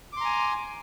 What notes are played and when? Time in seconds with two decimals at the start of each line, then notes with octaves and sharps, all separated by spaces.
0.13 D6
0.17 C6
0.21 A#5
0.25 G#5